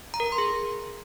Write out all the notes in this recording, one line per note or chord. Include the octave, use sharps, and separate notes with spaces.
A#5
A#4
A#5
C6
G#4